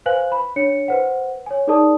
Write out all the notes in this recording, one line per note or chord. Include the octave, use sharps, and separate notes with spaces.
B4 C5 F5 G#5 F#6 F#7
B5
D4 C#5 C#7
B4 C5 F#5
C#5 G#5
D#4 G#4 A#4 D5 A5 D#6